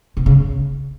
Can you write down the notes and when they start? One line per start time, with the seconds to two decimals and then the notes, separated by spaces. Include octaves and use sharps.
0.17 B2
0.26 C#3